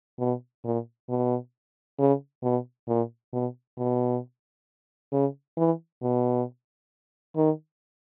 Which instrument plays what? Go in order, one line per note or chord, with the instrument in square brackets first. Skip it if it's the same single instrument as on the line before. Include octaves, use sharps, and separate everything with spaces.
[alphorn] B2
A#2
B2
C#3
B2
A#2
B2
B2
C#3
E3
B2
D#3